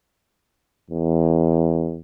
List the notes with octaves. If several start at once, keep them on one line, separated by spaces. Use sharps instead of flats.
E2